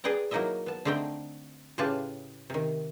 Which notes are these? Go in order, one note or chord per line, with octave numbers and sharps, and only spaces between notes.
G#4 B4 D5 G5 A#5
F#3 A#3 D#4 E4 D#5 E5
B3 A5
D3 A3 C4 D#4 G5
A2 C#3 F4 G4 B4 A5
C3 D#3